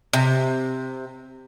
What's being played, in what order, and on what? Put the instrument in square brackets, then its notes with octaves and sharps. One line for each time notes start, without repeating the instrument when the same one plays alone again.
[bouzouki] C3